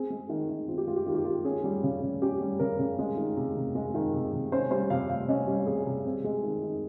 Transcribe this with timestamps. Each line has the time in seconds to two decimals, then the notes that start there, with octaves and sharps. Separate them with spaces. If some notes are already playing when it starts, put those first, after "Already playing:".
Already playing: C4 G#4
0.10 G#3
0.29 D#3
0.49 D#3
0.68 C4 F4
0.78 G4
0.87 G#3 F4
0.96 G4
1.06 D#3 F4
1.15 G4
1.24 D#3 F4
1.45 C#4 G#4
1.64 G3
1.83 C#3
2.02 C#3
2.22 C#4 G4
2.41 G3
2.59 C#3 A#4
2.79 C#3
2.99 G#3
3.17 D#3
3.37 C3
3.56 C3
3.75 G#3
3.94 D#3
4.13 C3
4.33 C3
4.52 C#4 C5
4.71 G3 C5
4.90 C3 F5
5.09 C3 F5
5.29 C#4 D#5
5.47 G3
5.66 C3 G#4
5.86 C3
6.05 C4
6.24 G#3
6.43 D#3
6.63 D#3